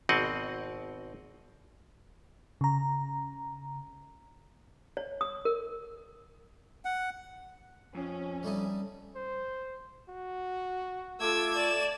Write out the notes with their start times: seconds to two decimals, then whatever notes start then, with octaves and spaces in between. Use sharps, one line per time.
0.09 G#1 B2 C4 D#5 F#5
2.61 C#3 A#5
4.97 C#5
5.21 D#6
5.45 A#4
6.85 F#5
7.95 F2 C#4
8.43 G3 A3 D#4
9.15 C5
10.09 F#4
11.20 A3 F4 A4 D6 E6 G#6
11.55 D5 E7